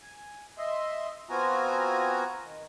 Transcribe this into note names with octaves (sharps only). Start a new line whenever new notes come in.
G#5
D#5 E5 C6
B3 C4 F4 F#4 G#5 A#5
D#3